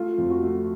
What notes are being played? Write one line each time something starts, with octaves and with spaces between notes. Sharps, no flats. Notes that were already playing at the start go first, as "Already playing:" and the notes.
Already playing: A3 F4
F2
F#4
A3